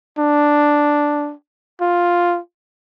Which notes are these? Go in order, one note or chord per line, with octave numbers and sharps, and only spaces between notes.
D4
F4